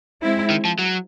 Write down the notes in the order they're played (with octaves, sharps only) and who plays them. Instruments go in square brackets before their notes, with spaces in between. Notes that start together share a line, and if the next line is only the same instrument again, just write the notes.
[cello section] G#3 C4 E4
[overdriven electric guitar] D#3
F3
F#3